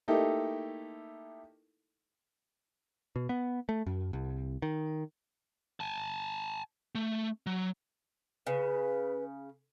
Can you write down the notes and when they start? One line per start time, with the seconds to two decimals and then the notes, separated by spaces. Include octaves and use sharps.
0.08 A3 A#3 D#4 E4 G4 A4
3.16 B2
3.29 B3
3.69 A3
3.86 F#2
4.13 C2
4.62 D#3
5.80 G#5 A5
6.95 A3
7.46 F#3
8.47 C#3 B4